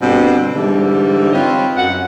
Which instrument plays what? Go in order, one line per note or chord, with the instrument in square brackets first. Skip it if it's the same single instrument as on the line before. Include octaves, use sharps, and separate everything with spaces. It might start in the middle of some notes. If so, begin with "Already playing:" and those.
[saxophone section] G2 B2 D3 C4
G#2 D3 E3 G3
C4 F4 B4 C#5 D#5
F#2 F#5